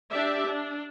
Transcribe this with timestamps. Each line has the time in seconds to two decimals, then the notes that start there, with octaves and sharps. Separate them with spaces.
0.10 D4 G4 D5 E5
0.46 D4